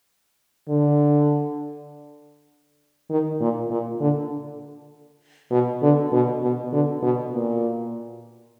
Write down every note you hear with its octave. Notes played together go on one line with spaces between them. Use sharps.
D3
D#3
A#2
A#2
D3
B2
D3
B2
B2
D3
B2
A#2